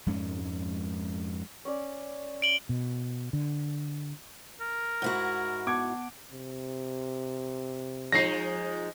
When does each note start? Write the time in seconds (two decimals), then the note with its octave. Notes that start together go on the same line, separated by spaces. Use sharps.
0.06 F2 G#2 G#3 C#4
1.65 C#4 D5
2.42 D7 F#7 G7
2.69 B2
3.33 D3
4.61 A#4
5.02 G#2 E4 F#4
5.67 B3 F#5 A5 D6 G#6
6.32 C3
8.12 F3 G#3 D#4 A#6 C7